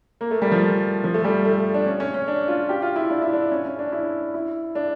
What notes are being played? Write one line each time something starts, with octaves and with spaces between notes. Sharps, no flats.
A#3
A3
G3
F3
F3
A3
G3
A3
D4
C#4
C#4
C#4
D4
F4
G4
F4
E4
D4
E4
D4
C#4
C#4
D4
E4
E4
D4